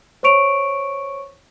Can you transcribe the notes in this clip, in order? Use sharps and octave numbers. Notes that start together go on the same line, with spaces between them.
C5 C#5 C#6 D7 F7